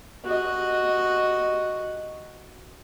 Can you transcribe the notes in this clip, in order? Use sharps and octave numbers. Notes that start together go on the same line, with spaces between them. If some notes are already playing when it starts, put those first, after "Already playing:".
F#4 D#5